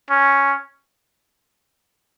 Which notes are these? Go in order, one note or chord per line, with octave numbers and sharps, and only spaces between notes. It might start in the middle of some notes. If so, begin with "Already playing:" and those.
C#4